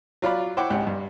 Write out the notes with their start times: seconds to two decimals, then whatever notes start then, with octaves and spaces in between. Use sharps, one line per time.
0.22 F#3 F4 D5 B5
0.57 E4 C5 C#5 F#5 G5 D6
0.70 G#1 C#2 G#3 G4 F#5
0.87 G2